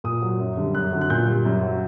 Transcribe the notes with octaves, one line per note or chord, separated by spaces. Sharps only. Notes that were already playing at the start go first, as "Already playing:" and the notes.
A#2 D#6
F#3
F#2
D3 G3
F#2 F#6
D3 F#3
F#6
A#2 G6
G3
F#2
F#3